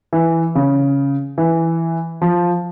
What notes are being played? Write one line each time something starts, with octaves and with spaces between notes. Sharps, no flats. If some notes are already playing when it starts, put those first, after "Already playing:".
E3
C#3
E3
F3